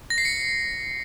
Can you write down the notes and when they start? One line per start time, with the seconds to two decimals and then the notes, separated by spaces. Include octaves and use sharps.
0.10 A#6
0.18 C7
0.25 C#7